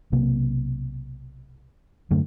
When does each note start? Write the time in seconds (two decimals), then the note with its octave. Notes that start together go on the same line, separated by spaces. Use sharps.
0.12 B1 C3 A#3
2.11 F#2 D3 A3